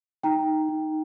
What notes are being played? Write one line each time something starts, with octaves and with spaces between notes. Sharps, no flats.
D#4 G5 A#5
D#4